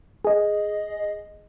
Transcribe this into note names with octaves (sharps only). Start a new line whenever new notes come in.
G#4 D#5